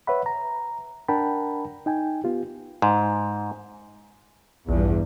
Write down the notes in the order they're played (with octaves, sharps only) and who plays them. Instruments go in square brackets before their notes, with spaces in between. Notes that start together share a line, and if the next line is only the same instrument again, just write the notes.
[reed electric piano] B4 C#5 E5 F#5 B5
A#5
D4 A#4 F#5 G5 A5 B5
D#4 G5 G#5
B3 F4 G4
[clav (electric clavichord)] G#2
[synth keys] A#1 [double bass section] E2 G2